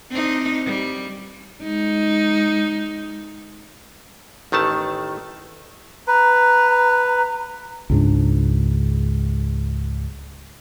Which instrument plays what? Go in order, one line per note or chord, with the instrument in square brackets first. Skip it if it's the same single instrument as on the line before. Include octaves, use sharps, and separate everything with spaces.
[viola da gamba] C4 D4 D#4
G3
G#3 D#4
[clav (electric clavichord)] A1 D#3 A3 A5
[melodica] B4 [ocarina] A#5
[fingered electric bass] C#2 G#2 D4